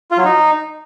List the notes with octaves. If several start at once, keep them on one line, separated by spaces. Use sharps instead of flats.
F4
F#3
D#4